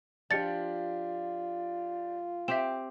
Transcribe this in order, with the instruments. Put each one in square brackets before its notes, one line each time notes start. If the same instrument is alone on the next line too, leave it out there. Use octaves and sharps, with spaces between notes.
[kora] F3 [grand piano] D4 G4 D5 [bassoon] F4 [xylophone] A6 C#7
[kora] C4 G4 [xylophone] E5 E7